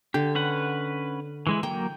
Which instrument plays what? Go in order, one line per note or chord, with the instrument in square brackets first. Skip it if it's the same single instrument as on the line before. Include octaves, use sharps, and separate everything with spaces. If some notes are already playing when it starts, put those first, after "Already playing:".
[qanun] D3 [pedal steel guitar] G4
[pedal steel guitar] C#4 B4 F#5
E3 G#3 E4
[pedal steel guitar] F#3 A#3 [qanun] G5